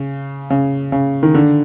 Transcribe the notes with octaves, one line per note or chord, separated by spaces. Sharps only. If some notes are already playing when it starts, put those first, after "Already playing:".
Already playing: C#3
C#3
C#3
D#3
D3